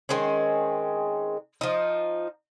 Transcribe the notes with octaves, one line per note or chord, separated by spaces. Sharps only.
D#3 G#3 C4 C#4
F3 D#4